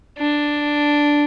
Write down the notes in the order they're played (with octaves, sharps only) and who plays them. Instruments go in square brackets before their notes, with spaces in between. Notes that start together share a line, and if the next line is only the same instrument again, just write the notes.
[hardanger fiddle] D4